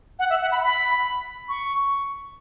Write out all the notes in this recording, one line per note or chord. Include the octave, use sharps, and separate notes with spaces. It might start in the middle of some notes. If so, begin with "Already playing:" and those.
F#5
E5
F#5
B5
B5
C#6